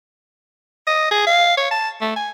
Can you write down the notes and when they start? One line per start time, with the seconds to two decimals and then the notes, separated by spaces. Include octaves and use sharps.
0.87 D#5
1.11 G#4
1.27 F5
1.57 C#5
1.71 A5
2.01 A3
2.16 G#5